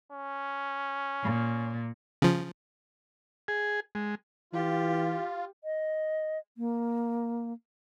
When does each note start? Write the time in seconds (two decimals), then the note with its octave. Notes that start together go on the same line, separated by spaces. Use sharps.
0.12 C#4
1.23 A#2
2.22 C#3 F3
3.48 G#4
3.95 G#3
4.53 E3 F4 G4
5.64 D#5
6.58 A#3